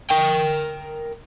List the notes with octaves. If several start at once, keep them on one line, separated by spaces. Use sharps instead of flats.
A#4 G5